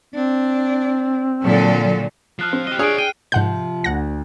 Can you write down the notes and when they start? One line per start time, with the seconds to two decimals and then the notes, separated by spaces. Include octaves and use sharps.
0.15 C4 D4
1.44 A#2 D3 F#3 A4
2.39 F3 F6 F#6 C7
2.53 C4
2.67 G4 D#5
2.79 D4 G#4 C#5 D#5 D#6 C7 D7
2.98 G5 D#7
3.32 G#2 C3 F3 F#5 G6
3.84 D2 F#5 A#6